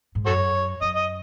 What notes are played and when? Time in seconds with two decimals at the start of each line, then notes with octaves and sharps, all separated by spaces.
0.15 G#2
0.26 F#2 F#4 A4 C#5
0.81 F#2 D#5
0.96 D#5